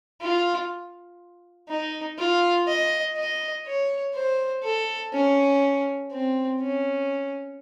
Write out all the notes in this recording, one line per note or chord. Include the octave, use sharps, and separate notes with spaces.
F4
D#4
F4
D#5
D#5
C#5
C5
A4
C#4
C4
C#4